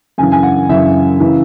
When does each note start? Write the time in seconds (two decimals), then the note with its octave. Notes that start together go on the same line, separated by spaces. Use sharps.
0.18 F#2 C#3 E3 G#5
0.32 G#5
0.43 F#5
0.69 F#2 C#3 E3 E5
1.20 C#3 E3